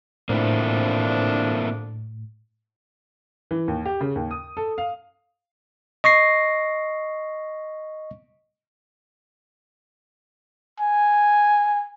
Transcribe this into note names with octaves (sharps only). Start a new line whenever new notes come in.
A2 D3 F3 A#3 C4 D4 E4
E3
D#2
G4
C#3
D#2
D#6
A4
F5
D#5 C#6 A#6 C7
G#5